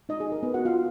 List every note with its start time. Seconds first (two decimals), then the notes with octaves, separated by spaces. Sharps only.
0.09 G#3 D#4 F#4 D#5
0.20 G#4
0.32 A#4
0.43 B3 B4
0.54 F#4 F#5
0.65 F4 F5